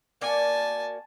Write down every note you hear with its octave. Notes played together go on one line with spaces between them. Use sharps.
A#3 F#4 D5 G#5 A5